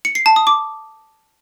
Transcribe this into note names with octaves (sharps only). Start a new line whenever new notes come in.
C#7
C7
A5
D#6
D6